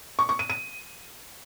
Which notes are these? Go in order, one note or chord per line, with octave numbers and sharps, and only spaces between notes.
C#6
C#6
D#7
D#7